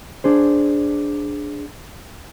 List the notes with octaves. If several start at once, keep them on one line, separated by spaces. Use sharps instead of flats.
D4 G#4 C5